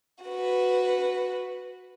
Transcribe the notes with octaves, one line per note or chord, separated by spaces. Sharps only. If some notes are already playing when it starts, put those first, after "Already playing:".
F#4 B4